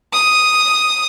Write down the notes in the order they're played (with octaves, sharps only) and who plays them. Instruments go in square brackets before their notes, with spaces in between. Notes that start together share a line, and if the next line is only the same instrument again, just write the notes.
[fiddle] D#6